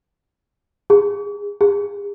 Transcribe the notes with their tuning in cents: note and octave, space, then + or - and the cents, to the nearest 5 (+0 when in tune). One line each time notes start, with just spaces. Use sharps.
G#4 -30
G#4 -35